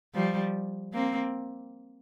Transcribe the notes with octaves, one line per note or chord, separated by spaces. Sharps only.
F3 G3
A#3 C4